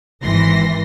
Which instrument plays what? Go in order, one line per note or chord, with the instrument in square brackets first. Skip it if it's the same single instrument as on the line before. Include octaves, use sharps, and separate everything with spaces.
[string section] G#1 E3 C6 A#6